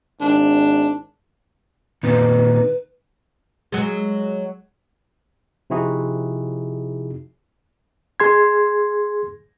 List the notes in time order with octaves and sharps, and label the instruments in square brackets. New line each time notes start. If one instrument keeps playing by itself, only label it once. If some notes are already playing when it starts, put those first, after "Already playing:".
[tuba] G#1 [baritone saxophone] D4
[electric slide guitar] A#2 D#3 C4 [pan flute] B4
[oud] F#3 G#3
[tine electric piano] C3 F3 D#4 E4 F#4 G#4
[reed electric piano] G#4 C6 G#6